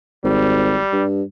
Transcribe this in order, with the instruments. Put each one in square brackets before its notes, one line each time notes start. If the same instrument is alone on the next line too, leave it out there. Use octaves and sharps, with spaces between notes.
[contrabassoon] G#1 [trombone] G3
[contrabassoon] G2